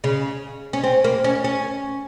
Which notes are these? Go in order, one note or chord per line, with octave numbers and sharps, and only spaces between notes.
C#3
C#4
C4
A#3
C#4
C#4